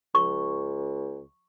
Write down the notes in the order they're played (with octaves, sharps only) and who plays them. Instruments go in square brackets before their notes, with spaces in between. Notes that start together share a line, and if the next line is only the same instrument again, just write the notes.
[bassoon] C#2 [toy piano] C#6